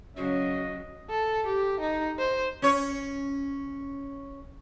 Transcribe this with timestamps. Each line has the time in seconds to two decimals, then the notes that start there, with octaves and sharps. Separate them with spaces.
0.17 C#3 F#3 C#4 F#4 D#5
1.10 A4
1.46 G4
1.81 D#4
2.19 C5
2.62 C#4 C#5